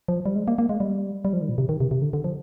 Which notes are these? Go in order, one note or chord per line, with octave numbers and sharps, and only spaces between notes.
F3
G3
G#3
A#3
A#3
G#3
G3
G3
F3
D#3
A#2
C3
D#3
C3
C3
D3
D3
F3